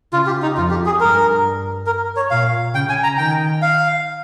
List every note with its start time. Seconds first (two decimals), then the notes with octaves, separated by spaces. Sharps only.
0.12 C#3 F4
0.27 G4
0.42 D#4
0.57 F2 F4
0.71 G4
0.86 G#4
0.99 G2 A#4
1.86 A#4
2.16 C#5
2.30 A#2 F5
2.74 C#3 G5
2.89 G#5
3.03 A#5
3.17 D#3 G5
3.62 F5